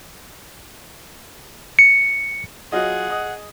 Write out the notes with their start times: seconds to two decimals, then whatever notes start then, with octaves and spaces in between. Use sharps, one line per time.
1.79 C#7
2.72 F#3 F4 G#4 D#5 F#5
3.09 D#5 D#6